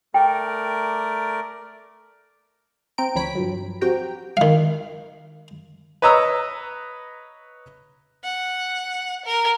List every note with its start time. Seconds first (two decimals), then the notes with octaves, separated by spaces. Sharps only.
0.14 A3 A#4 D5 G5
2.98 C4 G5 A#5 D7
3.15 D2 F3 C#5 B5 B6 D7
3.35 G2 F3 F#3
3.81 C4 F#4 G4 G5 A#5
4.37 D#3 F5
6.02 B4 C#5 D#5 A#5 E6
8.24 F#5
9.25 A#4